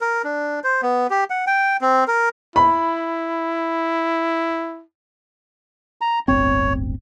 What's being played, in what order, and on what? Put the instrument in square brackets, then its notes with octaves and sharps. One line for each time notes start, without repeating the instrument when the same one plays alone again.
[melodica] A#4
D4
C5
B3
G4
F#5
G5
C4
A#4
[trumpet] E4 [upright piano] B5
[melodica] A#5
[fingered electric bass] D1 G1 C4 [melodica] C#5